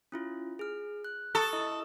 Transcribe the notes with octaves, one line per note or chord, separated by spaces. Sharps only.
C#4 E4 F4
G#4 F6
F#6
A4 C#6 D#6 A6
E4 D#5 D#6